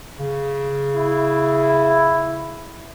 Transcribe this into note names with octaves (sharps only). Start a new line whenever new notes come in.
C#3
E4